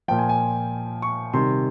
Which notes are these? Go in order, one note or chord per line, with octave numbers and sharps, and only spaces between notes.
A#2 F3 G5
G#5
G#5
C#6
C3 D#3 G3 C6